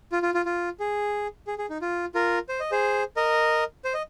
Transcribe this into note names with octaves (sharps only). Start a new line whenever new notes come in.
F4
F4
F4
F4
G#4
G#4
G#4
D#4
F4
F4 A#4
C5
D#5
G#4 C5
A#4 D#5
C5
D#5